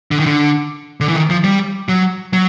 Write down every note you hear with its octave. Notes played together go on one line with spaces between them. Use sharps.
D3
D#3
D3
D3
E3
D#3
F3
G3
F#3
F#3